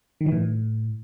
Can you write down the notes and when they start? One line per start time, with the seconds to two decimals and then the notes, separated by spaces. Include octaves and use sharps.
0.21 D#3
0.26 E3
0.32 A2